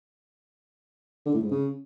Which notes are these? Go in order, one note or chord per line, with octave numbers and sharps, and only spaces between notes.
D3
A2
G#2
C#3